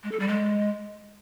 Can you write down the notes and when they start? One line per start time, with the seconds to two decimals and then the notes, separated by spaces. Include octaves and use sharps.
0.03 G#3
0.12 A4
0.20 G3
0.28 G#3